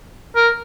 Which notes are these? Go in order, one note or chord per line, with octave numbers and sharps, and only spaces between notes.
A#4